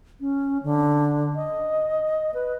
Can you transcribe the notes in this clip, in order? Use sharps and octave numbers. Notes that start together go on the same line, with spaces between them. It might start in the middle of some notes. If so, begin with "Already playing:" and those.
C#4
D3
D#5
B4